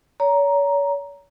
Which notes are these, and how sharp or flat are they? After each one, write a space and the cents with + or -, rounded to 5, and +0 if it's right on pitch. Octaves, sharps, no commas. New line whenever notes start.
C#5 +40 A#5 +5